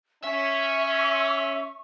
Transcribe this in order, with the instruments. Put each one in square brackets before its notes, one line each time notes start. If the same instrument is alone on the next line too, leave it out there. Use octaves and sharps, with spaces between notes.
[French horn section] C#4 [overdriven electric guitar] E5 [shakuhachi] C#6